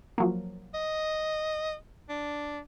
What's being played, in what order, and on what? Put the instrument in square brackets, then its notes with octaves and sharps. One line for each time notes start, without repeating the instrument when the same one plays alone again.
[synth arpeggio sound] F3 F#3 A#3
[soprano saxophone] D#5
D4